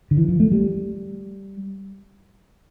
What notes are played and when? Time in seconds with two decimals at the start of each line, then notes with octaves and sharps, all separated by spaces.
0.11 D3
0.17 E3
0.28 F3
0.40 A3
0.52 G3